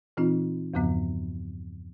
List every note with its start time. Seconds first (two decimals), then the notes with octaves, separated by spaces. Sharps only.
0.17 A#2 E3 C4 D#4 F4
0.74 E2 G2 C#3 F3 B3